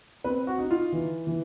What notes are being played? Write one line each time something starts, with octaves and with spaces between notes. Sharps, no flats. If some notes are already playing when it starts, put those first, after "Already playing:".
C4 B4
F#4
D#4
F4
E3
E3